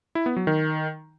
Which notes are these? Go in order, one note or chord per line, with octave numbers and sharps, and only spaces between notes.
E4
B3
F#3
D#3